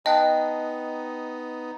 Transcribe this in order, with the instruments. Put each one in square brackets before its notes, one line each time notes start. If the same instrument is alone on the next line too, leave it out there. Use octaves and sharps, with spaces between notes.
[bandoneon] B3 D#4 [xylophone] D#5 [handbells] G5 A5 F#6